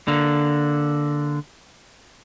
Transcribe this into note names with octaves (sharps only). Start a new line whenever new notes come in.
D3 A#3